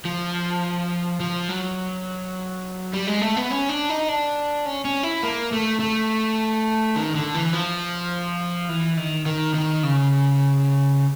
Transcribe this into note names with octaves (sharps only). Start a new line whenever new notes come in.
F3
F3
F#3
G3
G#3
A3
B3
C#4
D4
D#4
D4
C#4
C#4
E4
A#3
A3
A3
D#3
D3
E3
F3
E3
D#3
D#3
D#3
C#3